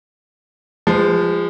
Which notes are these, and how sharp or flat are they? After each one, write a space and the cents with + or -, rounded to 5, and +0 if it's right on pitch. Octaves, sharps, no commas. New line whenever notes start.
F3 +0 G#3 -25 B4 +30